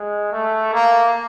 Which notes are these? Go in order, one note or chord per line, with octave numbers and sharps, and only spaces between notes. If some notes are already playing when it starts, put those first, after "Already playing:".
Already playing: G#3
A3
A#3